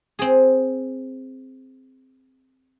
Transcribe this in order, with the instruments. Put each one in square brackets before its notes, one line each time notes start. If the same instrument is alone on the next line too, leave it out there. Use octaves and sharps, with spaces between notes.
[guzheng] C4 G#4